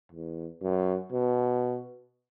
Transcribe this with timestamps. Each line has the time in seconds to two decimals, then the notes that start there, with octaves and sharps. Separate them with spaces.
0.12 E2
0.62 F#2
1.12 B2